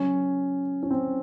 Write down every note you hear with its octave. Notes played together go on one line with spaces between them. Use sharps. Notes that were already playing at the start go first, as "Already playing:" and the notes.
Already playing: C#3 F#3 C#4
C#4
C4